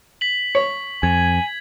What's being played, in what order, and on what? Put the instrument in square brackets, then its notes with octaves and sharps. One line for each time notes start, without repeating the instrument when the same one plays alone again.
[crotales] B6 F#7
[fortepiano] C#5
[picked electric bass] F2 [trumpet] G#5 [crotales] G#6